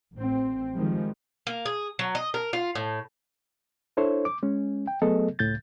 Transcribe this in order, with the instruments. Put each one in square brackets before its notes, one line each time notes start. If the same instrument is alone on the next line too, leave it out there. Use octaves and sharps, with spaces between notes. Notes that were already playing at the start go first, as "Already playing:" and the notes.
[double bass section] A1 C4
D#3 F3 G3 G#3
[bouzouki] A#3
G#4
F#3
D#5
A#4
F4
A2
[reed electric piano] D4 E4 A4 C5 C#5
D6
G#3 C#4
G5
F#3 A3 B3 G#4 A4 D#5
C#2 A2 G6 A6